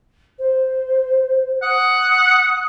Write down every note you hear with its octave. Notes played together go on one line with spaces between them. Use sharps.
C5
F#5 D#6